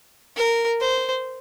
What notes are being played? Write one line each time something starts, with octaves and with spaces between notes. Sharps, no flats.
A#4
C5